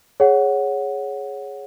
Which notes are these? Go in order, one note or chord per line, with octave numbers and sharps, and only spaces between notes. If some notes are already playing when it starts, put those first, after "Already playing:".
G#4 C#5 F#5